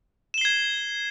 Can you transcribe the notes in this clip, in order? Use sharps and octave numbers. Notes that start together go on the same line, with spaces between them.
G#6 C7 E7 G7